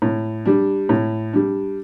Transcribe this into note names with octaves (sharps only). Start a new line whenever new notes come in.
A2
G3 D4
A2
G3 D4